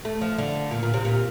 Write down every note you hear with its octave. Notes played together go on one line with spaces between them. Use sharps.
A3
F3
D3
A#2
A#2
C3
A#2